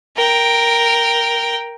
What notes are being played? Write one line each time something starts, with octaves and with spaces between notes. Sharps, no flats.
A#4 G5